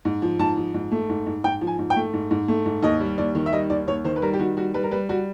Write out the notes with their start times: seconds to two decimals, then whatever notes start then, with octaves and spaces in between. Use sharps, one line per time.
0.05 G#2
0.22 F3
0.39 G#2 A5
0.57 F3
0.74 G#2
0.91 A3
1.09 G#2
1.26 G#2
1.44 G#2 G5
1.61 F3
1.67 G#5
1.79 G#2
1.90 G5
1.96 A3
2.14 G#2
2.31 G#2
2.48 A3
2.66 G#2
2.83 D#2 D#5
3.00 G3
3.18 D#2 D5
3.35 D#3
3.46 E5
3.53 G3 D#5
3.70 D#2 D5
3.87 D#2 C#5
4.05 D#3 C5
4.16 B4
4.22 G3 A#4
4.33 G4
4.39 D#3 F#4
4.57 G3 F#4
4.74 G3 B4
4.83 A#4
4.91 G3 B4
5.09 G3 F#4